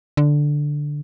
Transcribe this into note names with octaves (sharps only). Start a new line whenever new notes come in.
D3